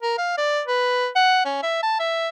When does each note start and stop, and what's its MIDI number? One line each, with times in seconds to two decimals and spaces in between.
0.02 0.17 70
0.18 0.33 77
0.38 0.61 74
0.67 1.08 71
1.16 1.42 78
1.45 1.58 61
1.63 1.78 76
1.83 1.99 81
2.00 2.28 76